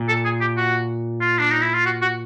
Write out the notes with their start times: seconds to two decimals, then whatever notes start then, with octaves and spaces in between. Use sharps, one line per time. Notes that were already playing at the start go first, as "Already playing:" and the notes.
Already playing: A#2
0.09 A4
0.25 G#4
0.41 G4
0.57 F#4
1.21 F4
1.39 D4
1.50 D#4
1.62 E4
1.74 F4
1.86 F#4
2.02 F#4